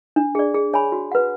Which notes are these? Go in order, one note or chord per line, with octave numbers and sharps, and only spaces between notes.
D4
G#4 D5
G#4
C#5 G#5 B5
F#4
B4 F#5